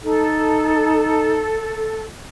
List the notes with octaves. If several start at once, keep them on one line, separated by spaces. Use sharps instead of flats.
D#4 A4